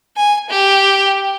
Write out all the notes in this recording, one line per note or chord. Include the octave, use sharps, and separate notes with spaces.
G#5
G4